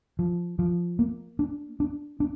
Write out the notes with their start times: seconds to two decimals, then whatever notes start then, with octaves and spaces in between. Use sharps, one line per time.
0.19 F3
0.59 F3
0.99 A#3
1.39 D4
1.80 D4
2.20 D4